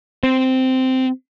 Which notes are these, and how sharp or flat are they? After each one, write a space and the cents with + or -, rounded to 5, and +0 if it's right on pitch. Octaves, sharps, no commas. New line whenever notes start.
C4 -10